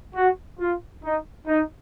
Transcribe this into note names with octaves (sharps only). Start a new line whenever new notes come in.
F#4
F4
D#4
D#4